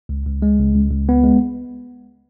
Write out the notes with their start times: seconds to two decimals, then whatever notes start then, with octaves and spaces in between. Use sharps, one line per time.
0.09 C#2
0.26 C#2
0.42 G#3
0.59 C#2
0.76 C#2
0.91 C#2
1.09 B3
1.24 G#3